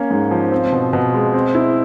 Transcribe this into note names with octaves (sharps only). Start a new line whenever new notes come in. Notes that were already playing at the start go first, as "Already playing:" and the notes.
Already playing: A#3 C#4
G#2
F3
C4
B2
B2
G#3
C4
E4